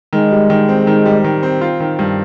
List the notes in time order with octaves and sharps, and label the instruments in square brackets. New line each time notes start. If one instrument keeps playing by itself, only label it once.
[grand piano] D#3 [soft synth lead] G#3
[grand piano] G3
D#3
C4
D#3
G3
D#3
C4
F4
D#3
G2